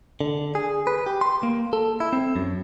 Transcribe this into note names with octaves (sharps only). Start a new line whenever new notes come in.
D3
G#4
B4
G4
C6
A#3
A4
E4
C4
F#2